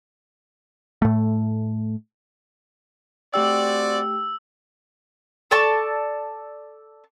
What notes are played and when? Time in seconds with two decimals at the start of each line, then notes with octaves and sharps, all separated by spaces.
1.02 A2 A3
3.34 A3 C4 F#4 G4 D5 G5 E6
5.51 A4 D5 A5 C#6